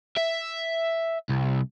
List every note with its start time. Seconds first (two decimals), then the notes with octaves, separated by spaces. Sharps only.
0.17 E5
1.29 C2